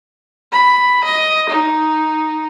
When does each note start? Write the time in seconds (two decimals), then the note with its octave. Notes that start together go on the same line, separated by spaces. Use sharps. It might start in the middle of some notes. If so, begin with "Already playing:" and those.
0.53 B5
1.04 D#5
1.50 D#4